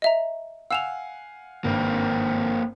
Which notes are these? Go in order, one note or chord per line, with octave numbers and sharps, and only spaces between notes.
D#5 E5 A#5
F5 F#5 G#5 E6 E7 F7
G#1 G2 A#3 C4